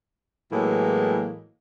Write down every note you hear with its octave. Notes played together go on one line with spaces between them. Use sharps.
A2 E3 F#3 G#3 A#3